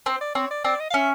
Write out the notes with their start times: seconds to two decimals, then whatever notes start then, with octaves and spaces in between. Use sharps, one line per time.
0.06 C4 C5
0.21 D5
0.35 C4 C#5
0.51 D5
0.64 C4 D5
0.80 D#5
0.90 F5
0.94 C#4 E5